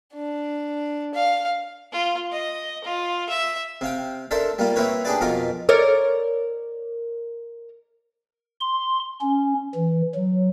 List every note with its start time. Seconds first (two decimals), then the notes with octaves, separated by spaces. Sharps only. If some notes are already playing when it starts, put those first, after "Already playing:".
0.14 D4
1.15 F5
1.92 F4
2.32 D#5
2.84 F4
3.29 E5
3.81 C3 F5 G5
4.31 D4 A4 A#4 C5 E5
4.59 G3 A#3 F4
4.76 A#3 C4 E4 A#4 B4 C#5
5.05 D4 G4 G#4 B4 D5
5.21 F2 B2 F4 A#4 A#5 D6
5.69 A#4 C#5 D5
8.61 C6
9.21 C#4
9.75 E3
10.15 F#3